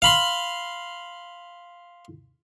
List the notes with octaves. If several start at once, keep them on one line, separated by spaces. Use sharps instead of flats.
F5 B5 C6